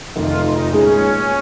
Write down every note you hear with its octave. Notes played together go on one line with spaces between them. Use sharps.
F1 F2 D#3 F4
D#4
A#2 G#3 C#4 D#4 G#4